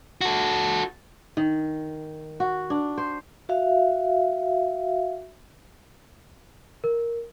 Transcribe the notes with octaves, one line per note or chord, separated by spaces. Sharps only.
F#4 A4
D#3
F#4
D4
C5
F#4 E5 F5
A#4